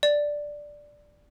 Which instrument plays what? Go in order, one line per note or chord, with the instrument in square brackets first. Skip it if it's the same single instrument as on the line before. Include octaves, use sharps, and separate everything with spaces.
[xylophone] D5